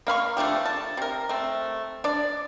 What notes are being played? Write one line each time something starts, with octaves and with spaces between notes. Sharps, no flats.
A#3 F5 B5 C#6
F3 A3 D4 G4
A5
C3 A#4
A3 C4
D4 D5